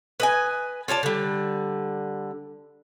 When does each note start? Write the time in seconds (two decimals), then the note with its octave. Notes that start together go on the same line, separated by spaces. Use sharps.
0.20 B4 D#5 G#5
0.88 F4 C#5 D5 A5
1.03 D3 G3